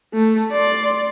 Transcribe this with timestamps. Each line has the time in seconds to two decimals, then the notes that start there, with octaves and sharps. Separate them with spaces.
0.14 A3
0.52 D5 C6